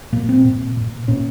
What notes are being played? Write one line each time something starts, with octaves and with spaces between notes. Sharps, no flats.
A#2 A#3
C4
A#2
A#2
A#2 C#4